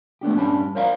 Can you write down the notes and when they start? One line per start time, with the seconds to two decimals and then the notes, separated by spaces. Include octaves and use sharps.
0.21 A3 B3 D4 G4
0.36 G2 G3 C#4 D4 A5 B5
0.75 A#4 C5 D5 F5 F#5 A#5